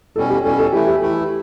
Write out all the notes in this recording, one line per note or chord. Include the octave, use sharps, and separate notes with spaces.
B2 G3 C#4 A4
G4
B2 G3 C#4 A4
A4
E3 A3 E4 G4
G4
E3 A3 E4